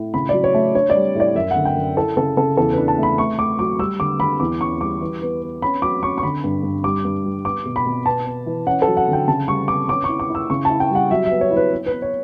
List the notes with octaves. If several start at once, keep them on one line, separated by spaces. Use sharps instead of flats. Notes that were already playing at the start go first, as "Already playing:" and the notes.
Already playing: A2
C#3 B5
F#3 D5
C#5
A3
D4 C#5
D5
G3
A2 D5
F#2 E5
D3 F#5
G5
F#2
E4 A4
C#3 A4
C#3 A4
E2 A4
B4
D4
A5
A3 B5
A3 C#6
A3 D6
F#3 D6
G3 E6
D3 D6
D3 B5
E2 D6
C#4 C#6
G3 D6
E3
B3
B3
C#4 B5
F#3 D6
C#4 C#6
C#6
D3 B5
G2
G2
G3 D6
G2
G3
B3 D6
B2
B5
B2
B3 A5
B3
E3
C#4 F#5
A4
F#3
F#5
D3
G5
C#3 A5
G3 C#6
B3 D6
C#4 D6
E4 C#6
D6
E4
E6
C#3 C#6
E4 A5
G5
G3 F#5
F#3 E5
E5
B3
C#5
E4
B4
B3
B4
B3
C#5